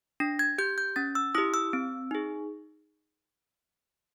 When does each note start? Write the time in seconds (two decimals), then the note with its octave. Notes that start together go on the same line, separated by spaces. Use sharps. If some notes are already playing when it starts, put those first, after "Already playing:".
0.20 D4 A#6
0.39 G#6
0.58 G4 G6
0.78 G6
0.96 C#4 A6
1.15 E6
1.35 E4 G4 D#6
1.54 E6
1.73 C4
2.11 D#4 G#4